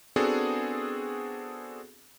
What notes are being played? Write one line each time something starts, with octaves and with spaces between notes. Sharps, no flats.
B3 C4 D4 F#4 G#4 A4